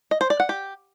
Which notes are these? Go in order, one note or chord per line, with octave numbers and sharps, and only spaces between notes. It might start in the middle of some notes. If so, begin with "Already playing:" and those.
D#5
C5
D5
F#5
G4